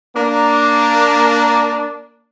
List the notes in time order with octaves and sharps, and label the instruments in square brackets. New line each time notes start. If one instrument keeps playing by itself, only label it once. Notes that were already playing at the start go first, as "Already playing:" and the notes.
[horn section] A#3 D4